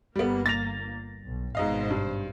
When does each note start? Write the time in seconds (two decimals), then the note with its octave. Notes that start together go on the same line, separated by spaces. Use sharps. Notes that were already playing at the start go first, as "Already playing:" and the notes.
0.16 G1 G2 G3 A#3 B3
0.46 A6 A#6 F7
1.25 B1
1.55 G#1 G#2 B2 C5 D#5 F5
1.90 G2